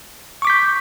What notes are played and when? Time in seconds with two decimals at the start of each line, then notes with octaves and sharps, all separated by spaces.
0.42 C#6
0.45 D6
0.47 B6
0.50 G6